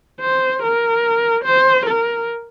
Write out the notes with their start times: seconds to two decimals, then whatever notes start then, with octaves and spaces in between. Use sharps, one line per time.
0.21 C5
0.62 A#4
1.44 C5
1.86 A#4